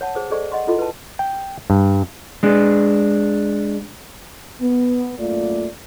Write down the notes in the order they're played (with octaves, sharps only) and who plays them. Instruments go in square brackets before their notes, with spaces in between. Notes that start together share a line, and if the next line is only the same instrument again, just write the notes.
[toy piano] C#5 F#5 A5
G#4 C5 D#6
G#4 A4 C5 D5 D#5 C#6
D#5 F#5 C6 C#6
E4 F4 A4 D#5 C6
B4 A5
[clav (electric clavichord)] G5
G2
[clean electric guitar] G#3 D4
[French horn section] B3
F#2 A3 A#3 F4 D5